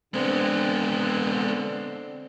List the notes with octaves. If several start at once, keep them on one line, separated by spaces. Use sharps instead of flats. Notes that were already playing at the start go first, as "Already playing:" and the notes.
D3 G#3 B3 C4